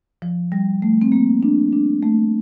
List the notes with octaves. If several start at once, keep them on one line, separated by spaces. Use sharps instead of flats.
F3
G3
A3
C4
A#3
D4
D4
A3